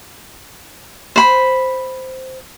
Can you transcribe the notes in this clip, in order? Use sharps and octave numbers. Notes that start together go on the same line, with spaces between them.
C5 B5